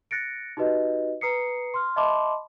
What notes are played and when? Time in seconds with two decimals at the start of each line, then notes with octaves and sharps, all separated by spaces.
0.11 F#6 A6 A#6 C#7 D7
0.57 D#4 F#4 G4 B4 D#5
1.21 B4 A#5 D#6 C7 C#7
1.74 C6 F6
1.96 D#5 E5 A5 B5 C6 D6